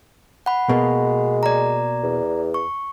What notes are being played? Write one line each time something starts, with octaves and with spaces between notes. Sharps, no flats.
F#5 B5
B2 G#3 A#3
D5 A#5
E2
C#6